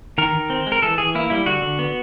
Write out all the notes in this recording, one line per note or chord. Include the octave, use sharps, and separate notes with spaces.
D#3 A#4
D#3
C4
G#3
A#4
E3 A4
E3 G#4
A#3 E4
G3 E4
D3 F#4
D3
B3